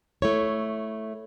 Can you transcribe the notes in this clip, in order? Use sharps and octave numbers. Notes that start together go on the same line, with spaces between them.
A3 E4 C#5